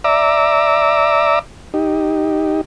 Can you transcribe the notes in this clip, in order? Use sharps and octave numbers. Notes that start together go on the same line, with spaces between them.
D5 E5 A#5 D6 E6
D#4 G4